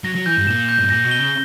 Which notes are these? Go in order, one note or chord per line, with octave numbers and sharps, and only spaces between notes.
F#3 A#6
F#3
E3 G6
G2
A#2 E7
G6
G2
A#2 A#6
B2
G7
C#3